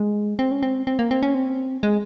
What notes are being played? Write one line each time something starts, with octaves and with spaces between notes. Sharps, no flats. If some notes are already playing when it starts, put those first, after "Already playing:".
Already playing: G#3
C4
C#4
C4
C4
A#3
C4
C#4
C4
G#3